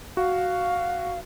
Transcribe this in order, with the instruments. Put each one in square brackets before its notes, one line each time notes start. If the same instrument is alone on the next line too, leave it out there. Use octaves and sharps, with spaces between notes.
[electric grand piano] F#4 [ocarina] F5